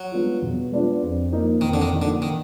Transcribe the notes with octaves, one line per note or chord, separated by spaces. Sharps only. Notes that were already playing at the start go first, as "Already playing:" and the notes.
Already playing: F#3
G#3 B3 D4 F4
B2
G#3 B3 D4 F4
F2
F3 A#3 D#4
F2 D#3
D3
D#3
F3 A#3 D#4
D3
D#3